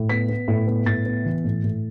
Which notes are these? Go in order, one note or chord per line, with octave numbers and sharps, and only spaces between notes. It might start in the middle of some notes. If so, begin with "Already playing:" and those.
Already playing: A2
B3 B6
B3
A2
B3
A2 A6
B3
E3
A2
A2